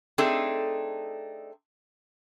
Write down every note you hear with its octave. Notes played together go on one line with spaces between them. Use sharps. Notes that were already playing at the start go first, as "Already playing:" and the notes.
A3 C4 D4 D#4 G#4 A4